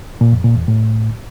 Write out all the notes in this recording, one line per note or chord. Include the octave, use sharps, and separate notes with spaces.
A#2
F2
A#2
E2
A2